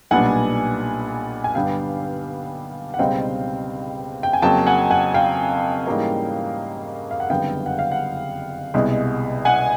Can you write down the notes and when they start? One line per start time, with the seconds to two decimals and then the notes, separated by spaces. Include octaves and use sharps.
0.11 B1 A#2 G3 B3 D4 F#5 G#5
1.44 G#5
1.55 G2 D3 G3 B3 D4 F5 G5
2.94 F#5
2.99 C#2 B2 G3 C4 D#4 F5 G5
4.23 G5
4.33 G#5
4.42 F2 C#3 F#3 A#3 G5 A5
4.67 F#5 G#5
4.90 F#5 G#5
5.14 F5 G5
5.86 G#2 E3 G3 A#3 C#4
7.11 F5
7.20 F#5
7.30 F#1 F2 D3 G3 B3 F5 G5
7.66 F#5
7.79 F5
7.92 F#5
8.74 C2 B2 G#3
9.45 F#5 G#5